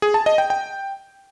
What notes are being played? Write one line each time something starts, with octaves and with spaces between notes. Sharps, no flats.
G#4
A5
D#5
G5
G5